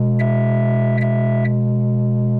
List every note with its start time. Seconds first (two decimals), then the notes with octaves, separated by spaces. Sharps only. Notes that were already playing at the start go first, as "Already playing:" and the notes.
Already playing: B2 G#3
0.19 E5
1.01 E5